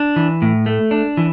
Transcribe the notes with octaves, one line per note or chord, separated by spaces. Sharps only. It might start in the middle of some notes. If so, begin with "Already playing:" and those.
Already playing: D4
E3
A2
A3
D4
E3